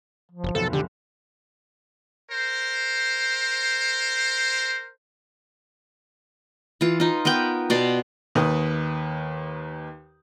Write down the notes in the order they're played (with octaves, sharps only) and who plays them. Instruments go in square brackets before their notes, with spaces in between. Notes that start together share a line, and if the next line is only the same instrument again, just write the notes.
[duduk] F3
[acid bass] F#1
[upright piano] F1 B1 [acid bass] A4
[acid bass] D3 [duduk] G4
[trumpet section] A#4 C5
[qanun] E3 F4
D#4 F4
B3 A#4 B4 G5
B2 D5 C6 D6
[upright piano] D#2 D#3 B4 D#6